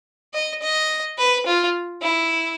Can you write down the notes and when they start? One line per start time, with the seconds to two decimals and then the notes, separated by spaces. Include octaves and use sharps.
0.34 D#5
0.62 D#5
1.18 B4
1.46 F4
2.02 E4